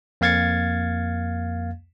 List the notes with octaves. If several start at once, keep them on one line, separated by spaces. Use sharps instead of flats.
F2 A#3 F5 G#6 A6 C#7